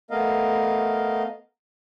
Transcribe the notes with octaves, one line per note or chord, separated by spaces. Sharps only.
A3 B3 A#4 D#5 F5